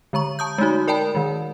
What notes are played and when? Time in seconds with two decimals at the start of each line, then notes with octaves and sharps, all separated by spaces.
0.13 D3 G#3 A#5 C#6
0.39 A5 D#6 G6
0.58 G#3 A3 D#4 F#4
0.88 A#4 D5 G5 A5 B5
1.15 D#3 G#3